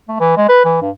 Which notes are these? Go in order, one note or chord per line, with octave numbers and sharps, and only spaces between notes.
A3
E3
G#3
B4
E3
G2